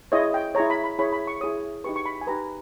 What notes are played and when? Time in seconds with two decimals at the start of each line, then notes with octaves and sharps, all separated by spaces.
0.12 E4 G#4 C#5 D#5
0.34 G5
0.55 E4 G#4 C#5 A#5
0.70 B5
0.84 B5
0.99 E4 G#4 C#5 B5
1.12 B5
1.27 C#6
1.41 E4 G#4 C#5 D#6
1.84 D#4 G4 B4 C#6
1.96 C#6
2.06 B5
2.21 G#5
2.27 D#4 G4 B4 A#5